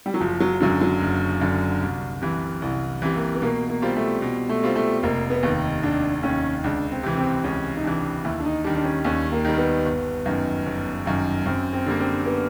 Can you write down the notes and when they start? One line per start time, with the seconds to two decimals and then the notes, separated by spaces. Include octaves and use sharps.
0.06 G3
0.14 F#3
0.20 F#1 F3
0.40 F#3
0.60 F#2 D3 F#3
0.81 F#3
1.01 F#1
1.41 F#2 D3
1.82 C2
2.22 C3 E3
2.62 C2 E3
3.02 C3 E3
3.16 A#3
3.35 B3
3.42 B2 A#3
3.69 A#3
3.82 G3 C4 F4
3.96 A3
4.22 B2
4.49 A3
4.63 G3 C4 F4
4.76 A3
5.03 F1 A#3
5.30 B3
5.43 D#2 D#3
5.83 F1 D4
6.23 D#2 D#3 C#4
6.64 C#2 D4
6.91 C4
7.03 C3 E3
7.17 C4
7.44 C#2 C#4
7.76 D#4
7.84 C3 E3 D4
8.24 D#2 E4
8.40 D4
8.45 D#4
8.64 D#3 G3 D4
8.75 D4
8.84 C#4
9.04 D#2 C#4
9.32 A#3
9.45 D#3 G3
9.58 B3
9.86 G1
10.26 F#2 D#3
10.66 G1
11.05 F#2 D#3
11.46 F#2 C4
11.73 C4
11.86 D3 G3 A#3
12.00 C4
12.26 B3